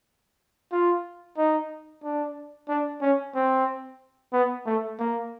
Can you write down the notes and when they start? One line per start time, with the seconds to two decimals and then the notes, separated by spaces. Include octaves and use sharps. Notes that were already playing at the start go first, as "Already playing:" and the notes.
0.72 F4
1.37 D#4
2.04 D4
2.69 D4
3.01 C#4
3.35 C4
4.33 B3
4.66 A3
4.99 A#3